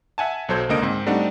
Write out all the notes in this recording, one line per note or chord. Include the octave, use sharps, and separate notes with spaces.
E5 F#5 G#5 A5
B1 F#3 A4 C5 G6 G#6
C#2 D3 A#3 D#5 D7
G#2 C4
G3 A3 C4 D4 D#4 F#5